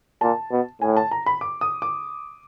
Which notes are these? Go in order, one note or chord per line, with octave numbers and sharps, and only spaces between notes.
A#2 A5
B2
A2 G#5
A5
A#5
B5
D6
D#6
D6